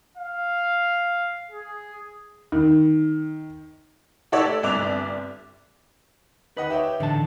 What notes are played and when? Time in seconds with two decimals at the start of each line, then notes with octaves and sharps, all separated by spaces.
0.18 F5
1.51 G#4
2.52 D#3
4.32 G4 A4 C#5 D5 F#5 E6
4.45 A3
4.63 G1 C2 D5 D6 F#6 F7
6.57 D#3 B4 D#5 F#5
6.70 G4 C#5 E5 G5
7.00 A2 D3 E3 D#4 A5